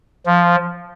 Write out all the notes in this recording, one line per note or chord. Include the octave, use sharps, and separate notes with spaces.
F3